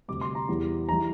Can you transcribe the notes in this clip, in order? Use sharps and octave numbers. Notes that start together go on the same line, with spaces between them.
D2 C3 G3 D6
C6
A#5
E2 E3 G3
E3 G3 A#5